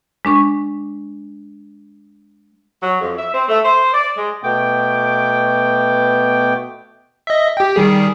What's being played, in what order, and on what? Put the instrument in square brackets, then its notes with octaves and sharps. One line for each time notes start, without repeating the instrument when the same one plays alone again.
[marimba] G#3 D4 C#6
[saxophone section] F#3
F2
E5
C4
A3
C5
D5
G#3
[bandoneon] B2 A3 B3 G5 D6
[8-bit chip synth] D#5 E5
G4 G5
D#3 G3 G#4